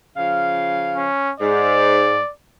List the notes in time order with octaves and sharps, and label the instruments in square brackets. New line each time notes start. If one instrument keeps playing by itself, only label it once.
[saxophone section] C#3 F3 F5
[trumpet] C#4
[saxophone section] G#2 [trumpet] D5